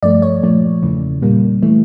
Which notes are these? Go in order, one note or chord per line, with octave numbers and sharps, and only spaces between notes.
G2 F3 A3 D5
C#5
A#2 F3 A3
E2 C#3 E3
A#2 G3 A#3
E3 A3